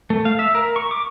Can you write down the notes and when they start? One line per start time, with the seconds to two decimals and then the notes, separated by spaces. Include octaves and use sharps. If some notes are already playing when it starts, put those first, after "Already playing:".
0.10 A3
0.25 F5
0.39 E5
0.55 A#4
0.76 C#6
0.91 D6